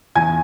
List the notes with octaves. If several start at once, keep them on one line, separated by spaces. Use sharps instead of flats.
E2 G#5 G#6